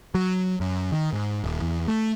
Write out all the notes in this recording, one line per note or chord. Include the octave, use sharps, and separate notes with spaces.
F#3
F#2
D#3
G#2
D#1
E2
A3